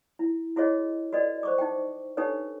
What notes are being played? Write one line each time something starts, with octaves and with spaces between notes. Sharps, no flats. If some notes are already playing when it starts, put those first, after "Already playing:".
E4
E4 F#4 G#4 C#5 D#5
F#4 A4 B4 D5 D#5
C5 C#6 D6
D#4 G5
D4 D#4 G4 A4 B4 C#5